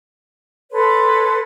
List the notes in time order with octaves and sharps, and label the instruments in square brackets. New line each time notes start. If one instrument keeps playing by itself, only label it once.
[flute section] A4 B4 C#5 C6